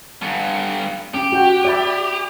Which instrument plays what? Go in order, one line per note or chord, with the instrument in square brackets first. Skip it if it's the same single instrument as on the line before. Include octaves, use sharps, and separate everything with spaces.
[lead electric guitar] G2 B3
[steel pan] C#4 [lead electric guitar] G4
[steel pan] F#4 G5
D5 E5 B5